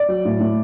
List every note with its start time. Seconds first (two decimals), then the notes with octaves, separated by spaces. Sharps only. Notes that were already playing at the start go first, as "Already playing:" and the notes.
Already playing: D5
0.09 F#3
0.25 A2
0.40 A2